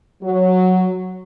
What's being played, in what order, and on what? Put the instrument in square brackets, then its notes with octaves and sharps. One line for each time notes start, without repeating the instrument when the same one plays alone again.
[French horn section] F#3